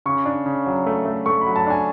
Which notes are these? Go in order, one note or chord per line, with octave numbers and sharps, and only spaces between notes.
C#3 C#6
D4
C#3
F#3
A3
A3
A3 C#6
B5
F#3
A5
D4 G#5